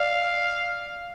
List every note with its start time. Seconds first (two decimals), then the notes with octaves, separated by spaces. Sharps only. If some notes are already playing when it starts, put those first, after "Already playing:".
Already playing: D5 F5